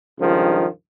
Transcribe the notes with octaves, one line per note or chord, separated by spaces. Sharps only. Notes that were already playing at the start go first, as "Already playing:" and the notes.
C#2 G2 D#3 F3